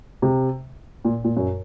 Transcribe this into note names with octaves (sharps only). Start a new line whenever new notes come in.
C3
A#2
A#2
F#2